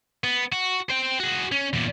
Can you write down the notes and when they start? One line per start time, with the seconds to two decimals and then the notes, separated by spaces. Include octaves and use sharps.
0.24 B3
0.52 F#4
0.90 C5 G5
1.20 F#4 G#4
1.52 C#4
1.73 E2 A#2